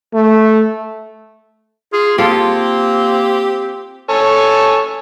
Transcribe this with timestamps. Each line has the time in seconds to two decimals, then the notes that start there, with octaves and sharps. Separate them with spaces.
0.14 A3
1.93 F4 G#4
2.18 A#3 C4 F4 G4 A4
4.09 A4 C#5 G#5